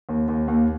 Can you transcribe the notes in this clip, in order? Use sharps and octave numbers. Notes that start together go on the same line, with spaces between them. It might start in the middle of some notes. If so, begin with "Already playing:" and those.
D#2
D#2
D#2